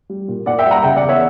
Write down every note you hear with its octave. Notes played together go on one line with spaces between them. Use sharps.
G3
A#2
A#2 D5 F#5
E5 G5
G3
F#5 A#5
C#3 E5 G5
D5 F#5
E2
C#5 E5